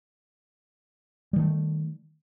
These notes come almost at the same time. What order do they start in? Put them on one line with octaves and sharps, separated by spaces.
G3 D#3 A3